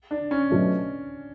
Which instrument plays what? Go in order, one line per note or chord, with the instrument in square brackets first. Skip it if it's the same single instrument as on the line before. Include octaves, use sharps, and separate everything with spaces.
[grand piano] D4
C#4
[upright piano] B2 F#3 A3